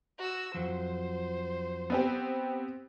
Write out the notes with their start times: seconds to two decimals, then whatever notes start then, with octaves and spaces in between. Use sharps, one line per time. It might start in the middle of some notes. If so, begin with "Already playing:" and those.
0.18 F#4 E6
0.54 F2 F#3 C5
1.90 B3 C4 G4